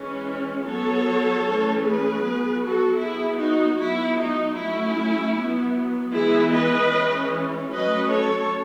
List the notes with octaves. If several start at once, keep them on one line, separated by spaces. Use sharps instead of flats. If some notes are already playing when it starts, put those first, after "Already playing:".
Already playing: E3 G#3 C#4
F#3 B3 A4 C#5
E3 A3 C#4
G#4 B4
F#3 B3
F#4 A4
F#3 B3 E4 G#4
D#4 F#4
F#3 B3 E4
D#4
F#3 A3 C#4 E4
F#3 B3
E3 G#3 B3 E4 G#4
B4 D#5
E3 G#3 C#4
F#3 A3 C#4 B4 D#5
A4 C#5